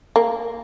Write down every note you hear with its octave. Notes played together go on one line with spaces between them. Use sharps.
A#3